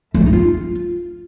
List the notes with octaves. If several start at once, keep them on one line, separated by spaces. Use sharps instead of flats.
A3
C4
D#4
F4